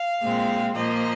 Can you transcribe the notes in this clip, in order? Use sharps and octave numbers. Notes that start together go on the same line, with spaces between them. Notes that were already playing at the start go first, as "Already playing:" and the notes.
Already playing: F5
A#2 G#3 C4
A#2 F3 A#3 D#5